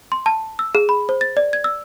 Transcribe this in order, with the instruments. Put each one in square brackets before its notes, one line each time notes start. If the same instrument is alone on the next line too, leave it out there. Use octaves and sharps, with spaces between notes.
[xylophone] C6
A5
E6
G#4
B5
C5
A6
D5
G#6
E6